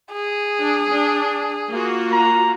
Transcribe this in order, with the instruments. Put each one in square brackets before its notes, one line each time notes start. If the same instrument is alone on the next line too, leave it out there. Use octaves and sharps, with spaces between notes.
[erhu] G#4
[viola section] D4
D4
A#3 F4 F#4
[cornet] A#5